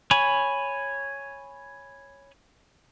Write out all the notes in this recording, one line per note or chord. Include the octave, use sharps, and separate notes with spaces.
C#5 G#5 B5 C#6